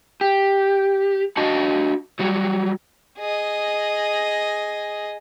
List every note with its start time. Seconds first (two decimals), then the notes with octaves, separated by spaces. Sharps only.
0.21 G4
1.37 D4 F#4 D#5 A5
2.19 F#3 G3 F#4
3.18 G#4 D#5